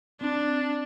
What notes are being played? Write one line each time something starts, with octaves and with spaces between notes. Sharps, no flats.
C4 D4